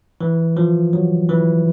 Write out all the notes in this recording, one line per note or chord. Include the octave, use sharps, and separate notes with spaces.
E3
F3
F#3
E3